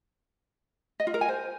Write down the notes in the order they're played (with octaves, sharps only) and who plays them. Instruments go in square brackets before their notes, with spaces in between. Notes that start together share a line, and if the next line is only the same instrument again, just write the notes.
[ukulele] D#5
F4
A#4
G#5
C5